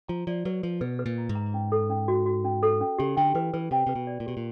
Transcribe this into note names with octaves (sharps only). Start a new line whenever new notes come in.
F3 A#5
F3 D5
F#3 B4
F3 B4
B2 B4
B4
A#2
A#5
G#2
A#5
C#4
A4
C#4
F#4
F#4
C#4
A4
C#4
C#3 G4
D3 G5
E3 B4
E3 B4
C3 G5
C3 B4
B2
D5
A#2
B2 G4
A#2